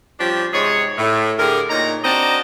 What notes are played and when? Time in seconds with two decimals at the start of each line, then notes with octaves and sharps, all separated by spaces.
0.19 F3 G3 C#4 D4 G4
0.53 G#2 C3 G#3 G#4 C#5
0.98 A2
1.38 D3 G4 G#4 A#4
1.70 A#2 D#4 C#5 A#5
2.04 C4 D4 F#4 D#5 A5 A#5